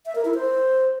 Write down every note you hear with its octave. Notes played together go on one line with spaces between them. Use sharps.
E5
A#4
E4
C5